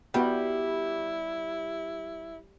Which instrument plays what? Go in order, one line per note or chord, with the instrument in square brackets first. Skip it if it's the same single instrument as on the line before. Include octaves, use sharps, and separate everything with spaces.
[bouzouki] G3 [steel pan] B3 F#4 G5 [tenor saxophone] E4